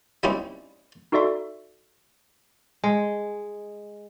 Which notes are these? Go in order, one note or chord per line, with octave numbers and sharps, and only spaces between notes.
G3 A#3 C4 C#4 D#4 E4
D#4 F#4 A4 D5 E5 C6
G#3